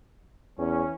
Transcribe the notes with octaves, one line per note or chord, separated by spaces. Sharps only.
E2 E3 C#4